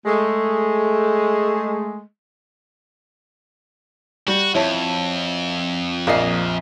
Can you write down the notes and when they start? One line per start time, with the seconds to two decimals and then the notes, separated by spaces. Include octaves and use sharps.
0.06 G#3 A3
4.28 G3 F#4
4.55 F2 E4 C#5 A5
6.07 A#1 A#3 D5 D#5 C7